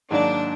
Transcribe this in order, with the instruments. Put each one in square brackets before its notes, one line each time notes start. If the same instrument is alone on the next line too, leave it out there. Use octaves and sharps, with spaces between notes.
[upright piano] G#2 D#3 F#3 A#3 [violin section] D4